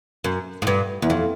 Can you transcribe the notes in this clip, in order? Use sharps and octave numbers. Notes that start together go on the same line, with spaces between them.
F#2
G#2
G2
E2
F2